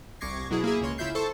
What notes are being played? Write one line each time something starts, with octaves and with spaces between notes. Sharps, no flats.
C2 C#6 D6 G#6 A#6 C7
B2 F#3 E4 G#4
A#3 E4 G#4
C#2 A#3 C#5 C6
C#3 E4 F4 E5 G6 C7
A4 C5 A5 C#6